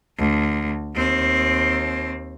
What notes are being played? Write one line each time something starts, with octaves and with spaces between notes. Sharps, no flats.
D2
D#2 C4